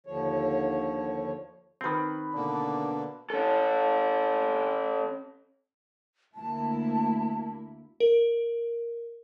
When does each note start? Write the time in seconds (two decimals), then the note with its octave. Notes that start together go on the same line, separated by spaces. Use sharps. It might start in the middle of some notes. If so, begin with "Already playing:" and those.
0.06 D#2 D3 F3 C#5
1.81 D#3 C4 B4 C6
2.35 B2 D3 A#3 D4
3.30 C#4 A4
6.35 D2 A#3 E4 A5
8.00 A#4